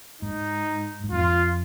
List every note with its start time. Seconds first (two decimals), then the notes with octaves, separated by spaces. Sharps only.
0.21 G#2 D#4
1.04 G#2
1.12 F2 F4